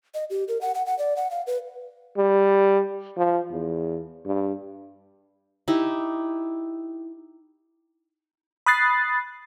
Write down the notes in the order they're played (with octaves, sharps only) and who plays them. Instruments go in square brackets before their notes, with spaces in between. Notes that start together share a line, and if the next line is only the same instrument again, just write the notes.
[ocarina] D#5
G4
A#4
F#5
F#5
F#5
D5
F#5
F5
B4
[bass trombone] G3
F3
E2
G2
[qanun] D#4 E4 G4
[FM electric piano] B5 D#6 F#6 A6 C7